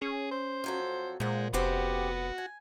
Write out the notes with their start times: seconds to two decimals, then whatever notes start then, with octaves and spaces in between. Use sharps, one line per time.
0.02 C#4 G#4
0.31 C5
0.64 F2 F#3 A4
1.20 A#2 G#3 C5 F#5
1.53 F1 C#3 B3 F#4 G4 C5
2.38 G#5